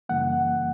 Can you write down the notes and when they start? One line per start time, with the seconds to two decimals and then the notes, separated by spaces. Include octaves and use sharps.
0.09 F#2 C#3 E3 G3 A#3 F#5